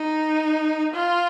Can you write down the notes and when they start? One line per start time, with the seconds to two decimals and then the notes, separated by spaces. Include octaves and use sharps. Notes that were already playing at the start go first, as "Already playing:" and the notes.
Already playing: D#4
0.94 F4